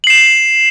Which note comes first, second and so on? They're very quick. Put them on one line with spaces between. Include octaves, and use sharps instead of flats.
F#7 C7 E7